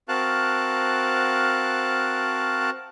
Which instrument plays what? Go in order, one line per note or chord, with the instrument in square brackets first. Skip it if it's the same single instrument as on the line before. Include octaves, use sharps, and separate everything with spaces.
[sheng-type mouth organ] C4 F#4 A#4 F5 A5 F#6